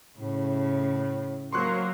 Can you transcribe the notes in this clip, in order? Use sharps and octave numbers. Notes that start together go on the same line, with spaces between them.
A2 C#3 A3
F#3 A#3 A#4 C5 C6 C#6 F#6